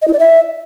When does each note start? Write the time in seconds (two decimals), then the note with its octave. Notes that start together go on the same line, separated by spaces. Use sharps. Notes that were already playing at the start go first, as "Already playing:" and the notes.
0.02 D#5
0.08 E4
0.13 D5
0.19 E5